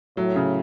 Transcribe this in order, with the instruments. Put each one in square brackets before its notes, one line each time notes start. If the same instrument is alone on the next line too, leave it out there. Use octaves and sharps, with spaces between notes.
[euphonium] A2 [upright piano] F#3
[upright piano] C#3